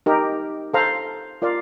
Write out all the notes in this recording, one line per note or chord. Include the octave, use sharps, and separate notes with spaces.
D#4 G4 A#4
A4 C5 F5 A#5
F4 A#4 D5 F5